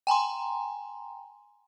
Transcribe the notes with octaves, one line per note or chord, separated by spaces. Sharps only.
G5 G#5 A#5 C6